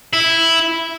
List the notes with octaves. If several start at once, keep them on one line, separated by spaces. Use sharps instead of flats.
E4